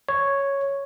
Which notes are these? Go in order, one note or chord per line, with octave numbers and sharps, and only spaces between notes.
C#5